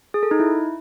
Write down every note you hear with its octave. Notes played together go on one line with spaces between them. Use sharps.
G#4
A4
D#4
E4